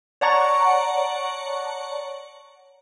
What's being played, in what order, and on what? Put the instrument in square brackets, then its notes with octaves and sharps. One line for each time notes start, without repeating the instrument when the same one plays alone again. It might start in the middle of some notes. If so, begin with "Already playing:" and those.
[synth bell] C#5 D5 F#5 A5 A#5 C#6